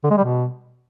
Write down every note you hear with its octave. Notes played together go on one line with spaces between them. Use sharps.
D3
G#3
G3
B2